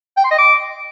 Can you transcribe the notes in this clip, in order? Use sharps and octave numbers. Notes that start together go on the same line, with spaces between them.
G5
C6
D#5
D6